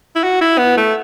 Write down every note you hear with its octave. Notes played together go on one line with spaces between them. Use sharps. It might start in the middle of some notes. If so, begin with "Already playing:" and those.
E4
F#4
E4
B3
A3